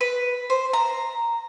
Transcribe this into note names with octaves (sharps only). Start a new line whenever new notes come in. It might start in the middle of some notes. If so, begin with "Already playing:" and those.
B4
C5
A#5